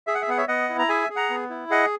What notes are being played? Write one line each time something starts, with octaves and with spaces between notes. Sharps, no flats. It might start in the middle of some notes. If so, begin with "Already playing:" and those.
G#4 E5
F#5
E5
B3 F#5
C#5 E5
B3 D#5 F#5
E4
A#5
G#4 E5 G#5
G#4
F#5 A#5
B3
E4
G#4 D#5 F#5